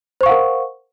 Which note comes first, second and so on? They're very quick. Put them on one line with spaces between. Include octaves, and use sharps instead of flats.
C5 C#6 F5 F#5 A#4